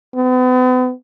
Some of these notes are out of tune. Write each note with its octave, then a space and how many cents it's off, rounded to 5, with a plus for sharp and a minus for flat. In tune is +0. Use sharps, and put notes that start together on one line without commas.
B3 +40